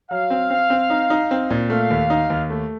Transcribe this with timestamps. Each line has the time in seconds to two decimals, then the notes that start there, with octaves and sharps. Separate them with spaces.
0.11 F#3 F5
0.30 C4
0.50 C4
0.70 C4
0.90 D#4
1.10 D#4
1.31 C4
1.50 A#2
1.70 A3 F5
1.90 D#2
2.10 D#4
2.30 D#2
2.50 A3